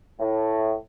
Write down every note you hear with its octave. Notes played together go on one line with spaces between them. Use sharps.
A2